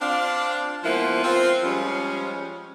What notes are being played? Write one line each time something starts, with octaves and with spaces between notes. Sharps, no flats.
C4 D4 F4 D5 F5
F3 G#3 A#3 B3 E4 C5
C4 F4
F3 G3 G#3 C#4